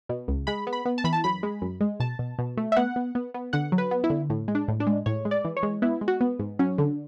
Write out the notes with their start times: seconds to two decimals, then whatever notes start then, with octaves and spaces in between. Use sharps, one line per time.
0.09 B2
0.28 C#2
0.47 G#3 B5
0.67 B3
0.73 B5
0.85 B3
0.98 A5
1.04 E3 B5
1.13 A5
1.24 F#2 B5
1.43 G#3
1.62 F#2
1.81 G#3
2.00 B2 A5
2.19 B2
2.39 B2
2.57 A3
2.72 E5
2.77 B3 F#5
2.96 B3
3.15 B3
3.34 B3
3.53 D3 F#5
3.72 F#3
3.78 B4
3.91 B3
4.04 E4
4.10 D3
4.30 A2
4.48 G#3
4.55 D4
4.68 A2
4.80 D4
4.87 G#3
5.06 A2 C#5
5.25 G#3
5.31 D5
5.45 E3
5.57 C#5
5.63 G#3
5.82 B3 E4
6.01 G#3
6.08 F#4
6.21 B3
6.39 G#2
6.59 F#3 C#4
6.78 D3